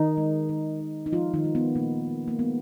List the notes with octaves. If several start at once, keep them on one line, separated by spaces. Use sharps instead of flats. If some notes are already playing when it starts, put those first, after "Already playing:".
Already playing: D#3 D#4
G#3
D#3
D#3
D#4
F3 G#3 F4
D#3 D#4
G#3
B3
A#2 A#3
A#2
A#3
G#3 B3